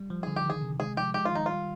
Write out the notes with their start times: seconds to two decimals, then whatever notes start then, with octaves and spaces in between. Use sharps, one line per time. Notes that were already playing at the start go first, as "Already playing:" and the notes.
Already playing: G3
0.10 F3
0.23 D3 G#4
0.36 G4
0.45 D#3 G#4
0.62 C3
0.80 G#3 G#4
0.97 F3 G4
1.14 G#3 G4
1.25 F4
1.32 D#3 D#4
1.46 G3 F4